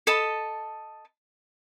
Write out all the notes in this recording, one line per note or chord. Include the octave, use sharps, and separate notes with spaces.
A4 D#5 A5 B5